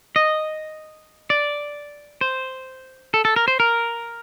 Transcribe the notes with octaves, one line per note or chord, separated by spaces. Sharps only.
D#5
D5
C5
A4
A4
A#4
C5
A#4